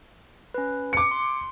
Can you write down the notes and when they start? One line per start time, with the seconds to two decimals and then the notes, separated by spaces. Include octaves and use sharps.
0.54 C#4 B4
0.93 D6 C#7
1.11 C6